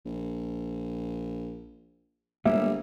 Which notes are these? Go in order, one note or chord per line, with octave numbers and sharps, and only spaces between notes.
A#1
G1 G3 G#3 A#3 E5